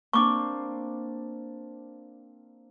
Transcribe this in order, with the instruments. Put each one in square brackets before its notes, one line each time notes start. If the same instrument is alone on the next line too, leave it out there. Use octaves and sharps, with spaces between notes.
[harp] A#3 C4 D4 [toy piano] C#6 D6